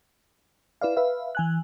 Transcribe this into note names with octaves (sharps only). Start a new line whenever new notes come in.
E4 B4 D5 F5
B4 E5 F5
E3 G#5 F#6